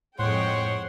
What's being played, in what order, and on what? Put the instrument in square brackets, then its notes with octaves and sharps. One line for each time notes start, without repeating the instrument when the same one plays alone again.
[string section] F2 G#3 G5 [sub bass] A2 [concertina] C5 F#5 C6 [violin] C#5